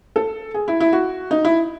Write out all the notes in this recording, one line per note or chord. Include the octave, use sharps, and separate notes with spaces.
A4
G#4
E4
E4
F#4
D#4
E4